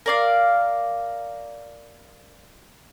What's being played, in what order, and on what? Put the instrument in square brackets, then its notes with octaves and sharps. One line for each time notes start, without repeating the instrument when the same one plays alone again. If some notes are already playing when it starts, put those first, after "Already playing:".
[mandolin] A#4 D5 F5